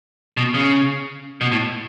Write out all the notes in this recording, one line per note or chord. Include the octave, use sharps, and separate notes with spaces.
B2
C#3
B2
A2